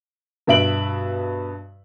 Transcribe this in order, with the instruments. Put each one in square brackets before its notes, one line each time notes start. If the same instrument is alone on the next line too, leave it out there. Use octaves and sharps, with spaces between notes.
[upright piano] G2 B2 E5 D7 F#7